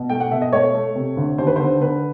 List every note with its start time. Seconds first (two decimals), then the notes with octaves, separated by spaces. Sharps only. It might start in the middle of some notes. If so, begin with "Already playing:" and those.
Already playing: B2
0.10 A3 G5
0.20 F#5
0.31 B2 E5
0.42 D#5
0.52 A3 C#5
0.74 A3
0.95 C3
1.17 D2
1.38 D#2 C5
1.47 B4
1.56 D3 C5
1.81 D3 B4